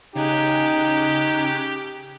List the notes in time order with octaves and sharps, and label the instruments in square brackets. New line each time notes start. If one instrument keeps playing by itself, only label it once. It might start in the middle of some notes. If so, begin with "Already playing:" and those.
[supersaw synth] C#3 G#5 F#6 [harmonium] D#4 [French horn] G4